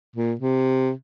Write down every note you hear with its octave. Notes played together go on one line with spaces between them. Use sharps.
A#2
C3